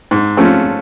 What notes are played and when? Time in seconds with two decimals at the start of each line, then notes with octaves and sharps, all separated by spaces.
0.11 G#2
0.37 F3 A3 C#4